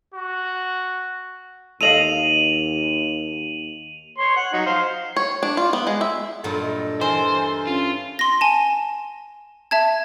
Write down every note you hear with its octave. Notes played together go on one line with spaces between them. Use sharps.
F#4
D#2 A4 D#5 F5 D#7 F7 F#7
C#5 C6
F#5
F#3 D#4
C5 F5
C#5
D4
F4
B3
G#3
E5
G2 A#2 F#3 A4
D#5
E3 A#4 C5 G#5
C#4 F4
C6 A#6
G#5 A5
E5 A5 G#6